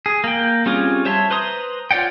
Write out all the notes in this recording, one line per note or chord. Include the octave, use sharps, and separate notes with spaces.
G#4
A#3 G5
G3 C4 C#4 F4 G#4
C5 C#5 E5 A5 C6
B4 C5 A#5 C6 D#6
F4 C#5 D5 F#5 G5